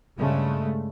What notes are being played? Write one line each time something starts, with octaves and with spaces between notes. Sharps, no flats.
G2 C#3 G#3 A3